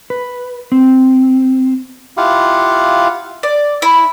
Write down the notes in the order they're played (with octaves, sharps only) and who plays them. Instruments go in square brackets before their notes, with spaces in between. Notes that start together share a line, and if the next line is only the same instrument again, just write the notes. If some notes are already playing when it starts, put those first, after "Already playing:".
[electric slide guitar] B4
C4
[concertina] E4 F4 G4 F5 F#5
[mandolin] D5
E4